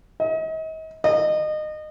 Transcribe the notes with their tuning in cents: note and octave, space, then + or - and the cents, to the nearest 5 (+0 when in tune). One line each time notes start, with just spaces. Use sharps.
D#5 +40
D#5 -25